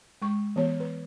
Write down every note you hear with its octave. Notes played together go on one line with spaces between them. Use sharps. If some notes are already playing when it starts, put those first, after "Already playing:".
G#3 C#6
E3 B3 C#5
B4